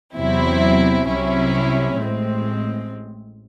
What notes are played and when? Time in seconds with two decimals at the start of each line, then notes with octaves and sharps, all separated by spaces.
0.15 E2 C3 F#3 C4 E4
1.07 C2 C3 F#3 C#4 E4
1.99 A1 A2 G#3 C4